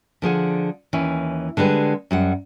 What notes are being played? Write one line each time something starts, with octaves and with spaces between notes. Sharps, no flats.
D3 F3 G#4 F#5
D#2 E3 C#4
D3 G3 G#3 B4
F#2 G3 F#5